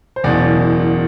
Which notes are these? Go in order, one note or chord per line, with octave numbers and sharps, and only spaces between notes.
C5
F#1 E2 B2 D5